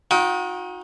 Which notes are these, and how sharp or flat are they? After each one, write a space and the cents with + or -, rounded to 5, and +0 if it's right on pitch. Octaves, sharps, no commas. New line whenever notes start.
D#4 +25 F#4 -40 G5 -15